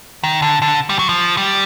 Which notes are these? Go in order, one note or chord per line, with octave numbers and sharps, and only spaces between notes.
D#3
D3
D3
G3
F#3
F3
G3